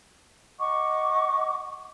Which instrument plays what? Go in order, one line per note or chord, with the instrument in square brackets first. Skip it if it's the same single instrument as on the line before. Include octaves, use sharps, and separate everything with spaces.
[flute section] D#5 F#5 C#6 D6